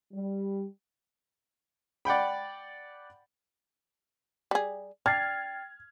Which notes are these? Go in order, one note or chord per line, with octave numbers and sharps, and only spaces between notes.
G3
D5 F#5 G5 B5
G3 G#4
D4 G5 F6 G#6 A6 C7